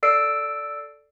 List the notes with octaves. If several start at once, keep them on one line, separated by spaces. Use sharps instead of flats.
A4 D5 E6 C7 D7